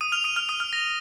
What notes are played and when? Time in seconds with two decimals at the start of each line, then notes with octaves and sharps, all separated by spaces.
0.01 D#6 D#7
0.12 F6 F7
0.24 D#6 D#7
0.36 F6 F7
0.49 D#6 D#7
0.60 F6
0.73 A#6